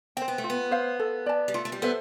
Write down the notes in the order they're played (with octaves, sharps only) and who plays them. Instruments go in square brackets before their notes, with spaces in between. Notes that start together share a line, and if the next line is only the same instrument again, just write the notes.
[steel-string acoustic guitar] C4 [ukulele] C5 G5
[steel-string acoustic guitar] B3
A3
[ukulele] F4
[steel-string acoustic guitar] B3
[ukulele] C5 F5
A4
D5 A5
[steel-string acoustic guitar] G3
[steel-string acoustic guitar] A3 [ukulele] F4
[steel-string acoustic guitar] A3
G3
[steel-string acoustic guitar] B3 [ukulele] A4 C5 E5